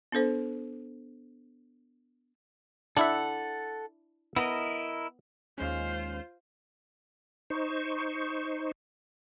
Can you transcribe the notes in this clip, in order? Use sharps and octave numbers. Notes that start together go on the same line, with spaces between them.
B3 D4 A4 C5
D4 E4 A4 E5 F#5
B3 E4 A#4 D#5
D#2 G#3 C#4 F4 C5
D#4 C5 C#6